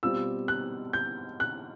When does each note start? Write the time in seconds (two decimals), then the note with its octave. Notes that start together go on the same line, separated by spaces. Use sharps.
0.03 B2 G3 C4 F4 E6
0.48 F#6
0.93 G6
1.40 F#6